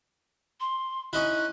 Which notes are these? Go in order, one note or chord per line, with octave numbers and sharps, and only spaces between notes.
C6
C#4 D#4 E4 F#6